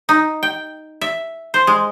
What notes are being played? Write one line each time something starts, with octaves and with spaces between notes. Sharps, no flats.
D#4
G5
E5
C5
G#3